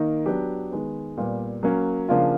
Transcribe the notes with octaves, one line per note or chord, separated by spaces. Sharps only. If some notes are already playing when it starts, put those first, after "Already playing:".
Already playing: D#3 A#3 D#4
F#3 B3 D4 G4
D#3 G#3 B3
A#2 G3 B3
F#3 A#3 C#4
C#3 F3 A#3 D4 F4